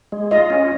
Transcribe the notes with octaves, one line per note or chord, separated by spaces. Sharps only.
G#3
F4 D#5
C#4